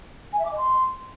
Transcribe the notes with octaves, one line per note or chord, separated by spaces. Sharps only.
G#5
E5
D6
D#5
C6